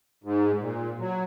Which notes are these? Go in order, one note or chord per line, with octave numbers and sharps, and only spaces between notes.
G#2
A#2
F#3